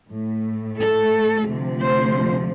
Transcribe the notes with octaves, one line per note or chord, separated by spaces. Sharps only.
A2 A3
A4
D2 C3 F3 A3
C5